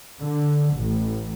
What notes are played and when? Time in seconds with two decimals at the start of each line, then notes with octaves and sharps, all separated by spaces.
0.20 D3
0.76 A1